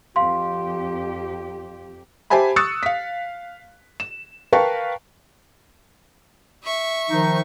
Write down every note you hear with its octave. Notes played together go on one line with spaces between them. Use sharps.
F2 G4 F5 C6
G4 C5 E5 G#5 A5 B5
C#6 D#6 E6 F#6 A6 C#7
F5 B6
E7
A#4 B4 F5 G5 A5 C#6
E5 C#6
D#3 F3 D#4